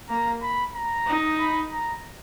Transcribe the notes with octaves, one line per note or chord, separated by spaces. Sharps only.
A#3 A#5
B5
A#5
D#4
B5
A#5